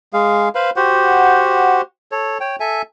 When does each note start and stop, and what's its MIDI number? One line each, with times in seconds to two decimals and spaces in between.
0.13 0.49 56
0.13 0.49 68
0.13 0.49 77
0.55 0.70 71
0.55 0.70 72
0.55 0.70 77
0.55 0.70 83
0.76 1.81 66
0.76 1.81 67
0.76 1.81 72
0.76 1.81 78
2.12 2.38 69
2.12 2.38 73
2.40 2.56 73
2.40 2.56 79
2.60 2.82 69
2.60 2.82 76
2.60 2.82 80